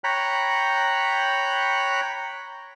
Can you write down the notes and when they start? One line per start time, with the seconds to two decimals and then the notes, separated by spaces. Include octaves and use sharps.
0.04 C#5 G5 A#5 B5 F#6